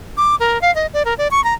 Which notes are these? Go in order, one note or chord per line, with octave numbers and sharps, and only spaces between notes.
D6
A#4
F5
D#5
D5
A#4
D5
C#6
A#5